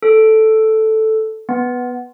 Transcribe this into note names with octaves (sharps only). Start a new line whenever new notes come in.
A4
B3